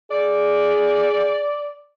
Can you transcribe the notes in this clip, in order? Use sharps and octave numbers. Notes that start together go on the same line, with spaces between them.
G#4 D5